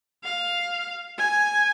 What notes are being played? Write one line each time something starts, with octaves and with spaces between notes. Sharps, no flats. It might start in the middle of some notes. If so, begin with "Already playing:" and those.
F5
G#5